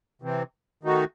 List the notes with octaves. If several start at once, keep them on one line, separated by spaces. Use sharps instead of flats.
C3 E3 C4
D#3 A3 D#4 F#4